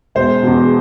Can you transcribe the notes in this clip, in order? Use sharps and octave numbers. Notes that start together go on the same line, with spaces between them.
E1 C5
E2 B2